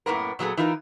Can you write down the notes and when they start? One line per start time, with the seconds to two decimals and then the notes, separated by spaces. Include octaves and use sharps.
0.06 F#2 A2 A#3 B3 A#4
0.39 A#2 F#3 B3 G#4 A4
0.57 E3 D#4 F4 A#4